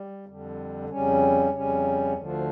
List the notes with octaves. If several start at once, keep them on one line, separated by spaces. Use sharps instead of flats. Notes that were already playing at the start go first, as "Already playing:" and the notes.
Already playing: G3
F2 D3 G3
F2 C#3 G3 C#4
F2 C#3 G3 C#4
D2 D3 F3